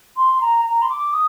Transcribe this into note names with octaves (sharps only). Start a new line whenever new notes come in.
C6
A#5
A#5
C6
D6
D#6